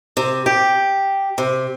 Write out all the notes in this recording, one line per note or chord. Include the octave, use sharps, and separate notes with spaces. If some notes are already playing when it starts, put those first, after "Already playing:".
C3
G4
C3